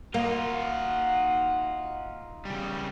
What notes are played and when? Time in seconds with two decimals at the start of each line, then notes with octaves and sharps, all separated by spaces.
0.14 A#3 D#4 F4 F#4 F#5
2.45 C#3 G3